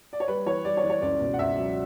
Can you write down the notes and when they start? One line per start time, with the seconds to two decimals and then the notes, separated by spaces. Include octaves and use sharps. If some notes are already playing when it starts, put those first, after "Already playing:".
0.13 D5
0.20 C#5
0.28 G3 B4
0.46 E3 C#5
0.65 G3 D5
0.77 C#5
0.83 E3
0.90 C#5
1.02 C#2 D5
1.20 B2
1.34 F#5
1.39 C#2 E5
1.57 F#3